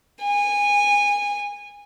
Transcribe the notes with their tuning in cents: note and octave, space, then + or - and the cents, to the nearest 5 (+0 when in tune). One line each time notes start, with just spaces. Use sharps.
G#5 -20